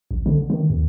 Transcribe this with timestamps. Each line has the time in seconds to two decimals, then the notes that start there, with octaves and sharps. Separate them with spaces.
0.11 A#1
0.26 D3
0.50 D#3
0.70 D#2